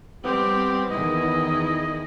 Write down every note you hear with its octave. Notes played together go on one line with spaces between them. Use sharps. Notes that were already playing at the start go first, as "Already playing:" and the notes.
G3 B3 C4 G4
E2 D#3 E4 G#4 D#5